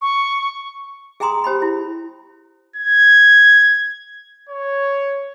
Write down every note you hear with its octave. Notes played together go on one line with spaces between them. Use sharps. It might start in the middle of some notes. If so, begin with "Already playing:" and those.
C#6
G#4 G5 G#5 A#5 C6 D#6
G4 C5 G5 B5
E4
G#6
C#5